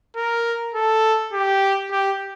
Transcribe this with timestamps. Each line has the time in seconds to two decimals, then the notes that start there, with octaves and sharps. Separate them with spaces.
0.17 A#4
0.75 A4
1.33 G4
1.91 G4